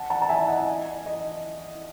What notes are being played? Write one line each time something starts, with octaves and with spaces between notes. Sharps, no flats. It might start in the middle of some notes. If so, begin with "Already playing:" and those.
Already playing: F#5 A5
F#5 A5
A5
E5 G#5
D#5 F#5
D#5